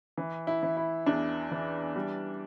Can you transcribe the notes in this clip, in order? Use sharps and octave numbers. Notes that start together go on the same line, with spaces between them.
E3
E4
E3
E4
E2 D4
E3
G3